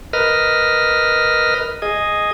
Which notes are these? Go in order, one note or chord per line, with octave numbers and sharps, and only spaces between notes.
A#4 B4 D#5 F6
G#4 D#5